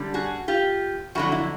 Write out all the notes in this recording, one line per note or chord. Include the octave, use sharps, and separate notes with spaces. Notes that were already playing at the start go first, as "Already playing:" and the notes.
Already playing: F#2 D3 G3
F#4 G#4
F4 G4
F2 D3 F#3 E4 F#4
E4